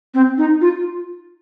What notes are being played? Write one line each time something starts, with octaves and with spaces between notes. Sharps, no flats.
C4
D#4
F4